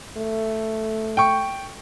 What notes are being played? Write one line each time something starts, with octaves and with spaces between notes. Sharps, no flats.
A3
G5 C#6